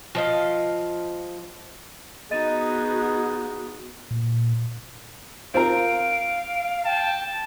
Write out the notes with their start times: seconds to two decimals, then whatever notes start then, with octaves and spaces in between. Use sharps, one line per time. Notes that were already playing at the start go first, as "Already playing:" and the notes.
0.15 F3 D#5 F5
2.31 B3 D#4 F#4 G#4 D#5 A6 D#7
4.11 A#2
5.54 C4 F4 A#4 F5 D7
6.85 G5 A5